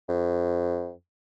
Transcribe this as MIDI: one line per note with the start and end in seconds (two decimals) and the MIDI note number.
0.09 0.92 41